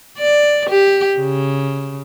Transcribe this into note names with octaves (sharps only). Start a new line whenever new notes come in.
D5
G4
C#3